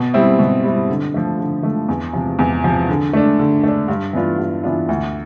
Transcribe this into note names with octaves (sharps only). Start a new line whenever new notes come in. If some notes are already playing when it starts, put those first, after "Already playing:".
Already playing: B2
G3 C4 E4
B2
G3 C4 E4
D3
F3 A3
D3
F3 A3
E2
C3 F3
E2
C3 F3
D3
A3 D4
D3
A3 D4
G2
E3 B3 D4 F4
G2
E3 B3 D4 F4
D2